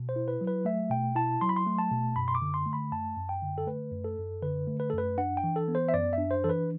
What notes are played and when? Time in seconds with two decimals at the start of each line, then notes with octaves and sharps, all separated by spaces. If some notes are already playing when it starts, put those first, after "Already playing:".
Already playing: B2
0.09 C5
0.16 E4
0.28 B4
0.41 F#3
0.47 B4
0.65 A3 E5
0.90 B2 G5
1.15 E4 A5
1.41 F#3 C6
1.49 B5
1.56 C6
1.67 A3
1.78 A5
1.91 B2
2.16 F#2 B5
2.28 C6
2.35 D6
2.42 D3
2.54 C6
2.66 A3
2.73 B5
2.92 F#2 A5
3.16 F#2
3.29 G5
3.43 D3
3.58 A4
3.67 A3 B4
3.92 F#2
4.04 A4
4.18 F#2
4.42 D3 B4
4.67 A3
4.80 B4
4.90 F#2 A4
4.98 B4
5.18 D4 F#5
5.37 G5
5.44 E3
5.56 A4
5.68 B3
5.75 C5
5.89 E5
5.94 F#2 D5
6.13 E5
6.18 D4
6.31 C5
6.44 E3 A4
6.49 B4